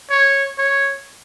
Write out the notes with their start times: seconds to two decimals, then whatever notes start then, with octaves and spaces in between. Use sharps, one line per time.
0.10 C#5
0.58 C#5